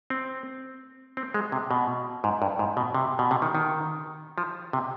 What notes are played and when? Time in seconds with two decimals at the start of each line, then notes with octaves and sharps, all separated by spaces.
0.10 C4
1.17 C4
1.34 G#3
1.52 C3
1.71 B2
2.24 G#2
2.42 G2
2.59 G#2
2.77 B2
2.94 C3
3.19 B2
3.31 C3
3.42 D#3
3.55 D#3
4.38 F3
4.73 C3